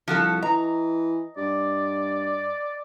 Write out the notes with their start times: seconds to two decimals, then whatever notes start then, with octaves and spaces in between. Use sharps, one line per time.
0.08 C2 F3 F#4 A4
0.42 E3 D#5 A#5
1.37 G2 D5